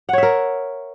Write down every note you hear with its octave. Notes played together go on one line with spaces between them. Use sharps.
A#4 C#5 E5 F#5